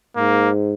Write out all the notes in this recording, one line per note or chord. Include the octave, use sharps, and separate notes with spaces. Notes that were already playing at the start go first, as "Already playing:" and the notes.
G#2 A#3